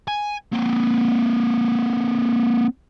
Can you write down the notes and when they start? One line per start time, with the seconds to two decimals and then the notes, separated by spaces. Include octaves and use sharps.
0.08 G#5
0.52 A#3 C4